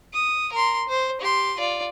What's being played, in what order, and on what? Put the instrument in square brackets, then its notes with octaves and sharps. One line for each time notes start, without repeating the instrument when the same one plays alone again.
[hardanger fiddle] D#6
A#4 C6
C5
G4 C6
F4 D5